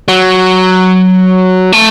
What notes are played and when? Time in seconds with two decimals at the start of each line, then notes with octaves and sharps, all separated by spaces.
0.08 F#3
1.73 A3